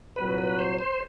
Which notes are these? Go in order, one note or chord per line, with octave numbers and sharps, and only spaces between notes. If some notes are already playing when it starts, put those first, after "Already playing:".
C2 A#2 F#3 B4
B4
C5
C5